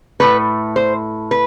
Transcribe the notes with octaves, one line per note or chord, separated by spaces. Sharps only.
A2 F3 A3 B4
C5
B4